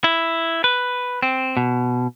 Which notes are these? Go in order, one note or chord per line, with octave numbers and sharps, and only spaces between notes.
E4
B4
C4
B2